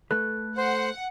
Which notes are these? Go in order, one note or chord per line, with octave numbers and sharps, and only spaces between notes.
A3 A4 B4 F#6
C5 F#5